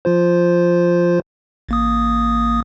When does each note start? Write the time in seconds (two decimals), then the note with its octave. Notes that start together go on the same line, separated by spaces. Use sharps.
0.05 F3 F4 C5
1.69 A1 A#3 D#6